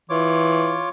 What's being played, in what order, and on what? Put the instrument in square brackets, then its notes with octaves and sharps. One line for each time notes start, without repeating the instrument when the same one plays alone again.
[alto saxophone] E3 [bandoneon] F4 C#5 D6